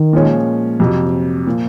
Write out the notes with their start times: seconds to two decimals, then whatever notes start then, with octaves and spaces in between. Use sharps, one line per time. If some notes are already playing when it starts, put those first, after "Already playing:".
Already playing: D#3
0.13 A#2 F3 G#3 C#4
0.80 F2 C3 F#3
1.47 A#2 F3